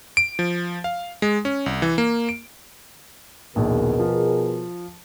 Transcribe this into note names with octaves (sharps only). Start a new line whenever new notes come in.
D7
F3
F5
G#3
C#4
C2
E3
A#3
D7
A#1 D#2 B2 G#4 A#4
F3